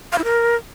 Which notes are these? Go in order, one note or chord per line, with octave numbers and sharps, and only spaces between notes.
F5
E4
A#4